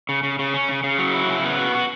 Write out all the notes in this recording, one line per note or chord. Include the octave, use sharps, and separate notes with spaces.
C#3
C#3
C#3
C#4
C#3
C#3
F#3
E4
C#3
B3
F#4
F#4